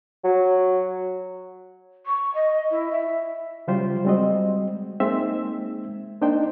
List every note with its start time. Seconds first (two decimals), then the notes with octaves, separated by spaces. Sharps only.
0.24 F#3
2.06 C#6
2.34 D#5
2.70 E4
2.90 E5
3.67 C#3 F#3 G3 F4 G4 C5
4.05 G3 G#3 C4 F#4 D#5
5.00 G#3 A#3 C4 D#4 E5
6.21 A#3 D4 D#4 C5 G5